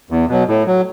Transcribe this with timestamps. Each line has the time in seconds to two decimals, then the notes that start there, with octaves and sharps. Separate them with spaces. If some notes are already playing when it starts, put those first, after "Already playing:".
0.10 E2
0.29 B2 F#3
0.48 A2
0.66 F#3